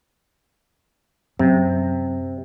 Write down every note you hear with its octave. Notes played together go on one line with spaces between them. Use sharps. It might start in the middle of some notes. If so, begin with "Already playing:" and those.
F#2 C3 C4